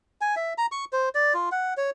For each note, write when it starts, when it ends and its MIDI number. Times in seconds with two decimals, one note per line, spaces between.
0.21 0.35 80
0.36 0.53 76
0.58 0.66 82
0.72 0.85 85
0.93 1.09 72
1.15 1.33 74
1.34 1.49 65
1.52 1.74 78
1.77 1.90 73